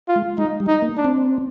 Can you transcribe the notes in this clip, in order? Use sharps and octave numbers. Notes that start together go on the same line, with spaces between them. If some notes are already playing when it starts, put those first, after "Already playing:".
F4
G#3
G#3 D#4
G3
D#4
A#3
D4
C4